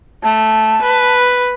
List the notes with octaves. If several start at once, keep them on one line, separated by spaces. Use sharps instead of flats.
A3 A5
B4